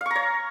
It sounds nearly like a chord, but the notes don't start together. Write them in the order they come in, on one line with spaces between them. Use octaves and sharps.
F5 C#6 A#5 C#5